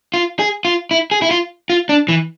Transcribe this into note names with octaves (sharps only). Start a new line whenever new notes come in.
F4
G#4
F4
E4
G#4
E4
F4
F4
D4
E3